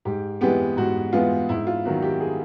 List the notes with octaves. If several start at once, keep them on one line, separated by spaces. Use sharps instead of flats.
G#2 G4
E3 G#3 B3 G4
G#2 F#4
E3 G#3 B3 F4
G#2 E4
F4
D#3 F#3 B3 F#4
G4
G#4